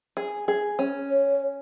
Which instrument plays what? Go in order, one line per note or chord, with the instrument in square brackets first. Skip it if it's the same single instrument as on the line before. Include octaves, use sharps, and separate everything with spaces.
[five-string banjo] G#4
G#4
C#4
[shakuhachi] C#5